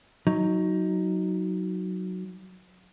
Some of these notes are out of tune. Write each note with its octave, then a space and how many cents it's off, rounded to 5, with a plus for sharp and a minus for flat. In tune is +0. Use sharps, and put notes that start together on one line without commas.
F#3 +0 D#4 +15